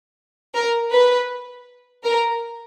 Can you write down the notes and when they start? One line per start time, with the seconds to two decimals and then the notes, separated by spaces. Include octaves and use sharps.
0.54 A#4
0.92 B4
2.04 A#4